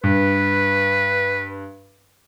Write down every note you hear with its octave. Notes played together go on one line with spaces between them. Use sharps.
G2 B4